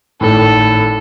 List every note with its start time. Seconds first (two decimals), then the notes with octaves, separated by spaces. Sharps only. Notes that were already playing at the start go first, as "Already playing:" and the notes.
0.21 G#1 A2 A4